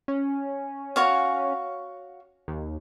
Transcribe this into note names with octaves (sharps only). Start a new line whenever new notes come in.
C#4
F#4 C#5 F5
D#2